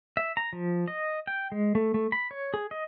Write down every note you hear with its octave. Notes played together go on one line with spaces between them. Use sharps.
E5
A#5
F3
D#5
G5
G#3
A3
A3
B5
C#5
G#4
D#5